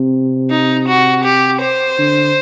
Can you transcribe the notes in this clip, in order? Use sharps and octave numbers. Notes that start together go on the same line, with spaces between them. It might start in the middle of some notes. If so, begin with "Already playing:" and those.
Already playing: C3
D#4
F#4
G4
C5
D3